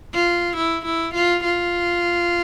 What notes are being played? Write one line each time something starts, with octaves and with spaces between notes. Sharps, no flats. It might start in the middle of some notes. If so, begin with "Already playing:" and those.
F4
E4
E4
F4
F4